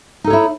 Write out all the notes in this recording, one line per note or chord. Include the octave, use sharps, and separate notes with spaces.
D#4 E4 A4 C#5